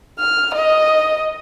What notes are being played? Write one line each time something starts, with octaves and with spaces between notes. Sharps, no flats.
F6
D#5